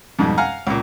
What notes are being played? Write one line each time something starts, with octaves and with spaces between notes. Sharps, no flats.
F2 G#2 B2 G3
F5 F#5 G#5 A#5 F6
C#2 A#2